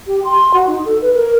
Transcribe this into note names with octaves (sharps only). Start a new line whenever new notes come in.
G4
C6
F#4
D#4
A4
B4
A#4